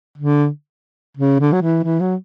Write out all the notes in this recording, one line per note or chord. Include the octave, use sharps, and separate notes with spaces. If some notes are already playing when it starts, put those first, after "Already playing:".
D3
C#3
D3
F#3
E3
E3
F#3